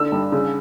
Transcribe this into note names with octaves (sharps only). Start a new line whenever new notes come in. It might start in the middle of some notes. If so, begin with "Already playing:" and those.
Already playing: D3 E6
G2
C#3